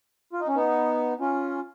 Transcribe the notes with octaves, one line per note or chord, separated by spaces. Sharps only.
F4
D#4
C#4
B3 D#4
C#4 F4